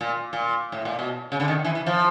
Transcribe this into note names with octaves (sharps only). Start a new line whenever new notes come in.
A#2
A#2
A2
A#2
B2
C#3
D3
D#3
E3
E3
F3